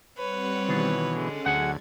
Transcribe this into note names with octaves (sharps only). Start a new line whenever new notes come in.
G3 C4 B4 C#5 F#5
B2 D#3 E3
D3 G#3 C#4 A4 F#5
D2 F#3 G#4 D5 F#5 G#6